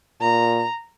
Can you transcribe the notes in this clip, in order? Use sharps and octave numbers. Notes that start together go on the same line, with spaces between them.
A#2 A#5